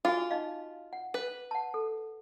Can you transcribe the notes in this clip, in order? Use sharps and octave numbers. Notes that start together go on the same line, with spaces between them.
F4 F#4 G#4 G#5
D#4 D#5 F5
F#5
B4
F#5 A5
A4